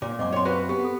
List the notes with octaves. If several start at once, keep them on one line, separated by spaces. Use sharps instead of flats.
A#2 D6
F#2 C4 D#5 D6
C#5 C6
F#4 B4 F5
B3 G4
A4